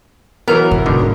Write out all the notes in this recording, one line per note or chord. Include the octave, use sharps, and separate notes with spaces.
E3 F#3 B3 A#4
F1 G#2
B2 D3 D#3